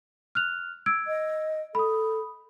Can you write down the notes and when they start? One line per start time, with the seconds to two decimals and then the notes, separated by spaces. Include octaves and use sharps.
0.35 F6 F#6 F7
0.86 E6 G#6 D7
1.08 D#5
1.75 A4 B5 D#6